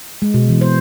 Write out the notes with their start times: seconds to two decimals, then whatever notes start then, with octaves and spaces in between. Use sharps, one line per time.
0.22 G#3
0.34 B2
0.49 E3
0.61 C5